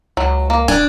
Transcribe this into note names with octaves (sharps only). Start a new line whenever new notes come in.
C#2 F#3
A#3
D#1 D4 G#5